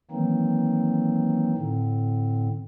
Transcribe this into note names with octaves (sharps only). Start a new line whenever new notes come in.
D#3 E3 F#3 A#3 C4 D#4
A2 D3 C4